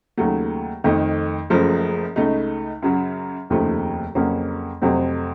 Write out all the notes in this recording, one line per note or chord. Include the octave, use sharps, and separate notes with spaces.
D#2 C#3 F#3 A3
F2 D#3 A3
F#1 F#2 C#3 F3 A3
C#2 C#3 A3 D#4
F#2 C#3 F#3
F1 D#2 C#3 F3 A3
F2 C#3 F#3 A#3 C#4
F2 C3 F#3 A3 C4